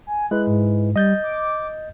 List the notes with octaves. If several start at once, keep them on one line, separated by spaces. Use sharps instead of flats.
G#5
G#3 E4 B4 F#6
G#2
G3 D#5 G6 A6
D6